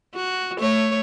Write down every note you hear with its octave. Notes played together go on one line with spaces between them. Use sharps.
F#4
A3 C#5